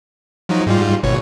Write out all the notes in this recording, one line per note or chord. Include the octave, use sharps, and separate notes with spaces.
F3 F#3 D#4
G#2 G3 F4
G#1 B2 C#5